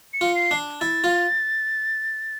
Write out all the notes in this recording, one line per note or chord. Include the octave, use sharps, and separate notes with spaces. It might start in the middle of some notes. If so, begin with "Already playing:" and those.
C#7
F4
C7
D4
E4 A6
F4